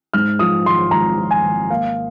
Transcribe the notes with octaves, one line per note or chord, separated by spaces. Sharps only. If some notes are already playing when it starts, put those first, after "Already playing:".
G#2 F6
F3 D#6
G#1 C6
G#1 A#5
F3
G#5
G#1
A#3 F5